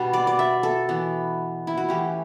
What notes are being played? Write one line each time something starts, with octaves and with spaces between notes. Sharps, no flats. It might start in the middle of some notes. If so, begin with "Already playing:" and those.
Already playing: B2 G3 D4
D5
D5
E5
A4
E3 B3 D4
E4
F#4
E3 A3 C#4 G4